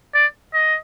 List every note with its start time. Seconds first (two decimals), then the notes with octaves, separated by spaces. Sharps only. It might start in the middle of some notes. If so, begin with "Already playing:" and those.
0.15 D5
0.53 D#5